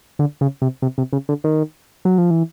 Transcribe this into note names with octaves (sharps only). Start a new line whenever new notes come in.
D3
C#3
C3
C3
C3
C#3
D3
D#3
F#3
F3
E3